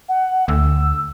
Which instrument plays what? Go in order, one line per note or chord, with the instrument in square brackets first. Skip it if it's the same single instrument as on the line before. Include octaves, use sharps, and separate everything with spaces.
[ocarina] F#5
[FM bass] D2 [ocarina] E6